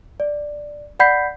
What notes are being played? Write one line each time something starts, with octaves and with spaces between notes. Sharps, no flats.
D5
D5 F#5 B5 G6 B6 C7